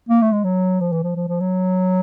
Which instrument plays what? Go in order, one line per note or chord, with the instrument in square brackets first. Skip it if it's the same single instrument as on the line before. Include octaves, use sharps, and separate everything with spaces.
[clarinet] A#3
A3
G#3
F#3
F3
E3
F3
F3
F3
F#3